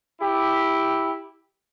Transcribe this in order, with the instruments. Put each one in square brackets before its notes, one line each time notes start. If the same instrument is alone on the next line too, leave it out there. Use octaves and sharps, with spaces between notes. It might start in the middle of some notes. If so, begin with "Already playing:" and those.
[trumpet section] E4 G4